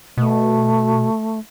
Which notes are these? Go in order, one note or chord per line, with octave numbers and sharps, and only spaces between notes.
B2 A3